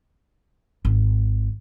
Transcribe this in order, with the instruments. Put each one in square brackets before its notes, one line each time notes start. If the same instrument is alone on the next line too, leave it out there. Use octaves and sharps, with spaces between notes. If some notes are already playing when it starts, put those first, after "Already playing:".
[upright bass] G#1